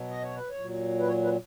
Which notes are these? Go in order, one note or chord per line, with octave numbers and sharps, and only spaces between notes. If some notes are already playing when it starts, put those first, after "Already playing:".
Already playing: B2 F#3
D#5
C#5
B4
C#5
A#2 F#3
B4
C#5
B4